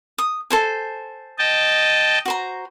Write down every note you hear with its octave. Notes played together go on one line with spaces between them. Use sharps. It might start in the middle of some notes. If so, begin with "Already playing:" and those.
D#6
A4 C5 G#5
D#5 G5 A5
F#4 C5 A#5